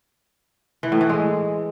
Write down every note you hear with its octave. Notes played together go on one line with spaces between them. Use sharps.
E3
A2
E3
G#3